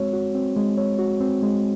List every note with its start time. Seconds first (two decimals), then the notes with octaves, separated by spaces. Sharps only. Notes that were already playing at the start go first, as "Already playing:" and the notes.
Already playing: G#3 C4 F#4 C#5
0.13 F#4
0.35 C4
0.56 G#3
0.78 C#5
0.99 F#4
1.21 C4
1.42 G#3